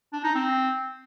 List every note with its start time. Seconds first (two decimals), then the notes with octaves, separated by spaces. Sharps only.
0.13 D4
0.24 D#4
0.35 C4